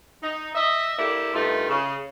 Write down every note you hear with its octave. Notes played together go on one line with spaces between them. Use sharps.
D#4
D#5 E5
A#3 D4 E4 G4 A4
G2 D#3 A3 D#4 F4
C#3